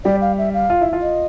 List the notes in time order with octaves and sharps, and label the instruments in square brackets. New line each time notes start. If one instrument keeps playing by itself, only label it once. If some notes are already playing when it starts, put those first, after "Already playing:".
[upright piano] G3 G4 [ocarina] D5
[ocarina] F5
E5
F5
[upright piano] F4
E4
F4
[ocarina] D#5